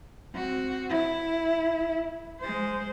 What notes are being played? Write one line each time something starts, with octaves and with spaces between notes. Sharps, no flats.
C4 F#4
E4
G#3 C5